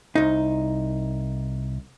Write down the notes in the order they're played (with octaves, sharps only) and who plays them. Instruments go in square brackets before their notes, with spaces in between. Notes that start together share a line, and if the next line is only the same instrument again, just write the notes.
[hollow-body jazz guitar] C2 D#4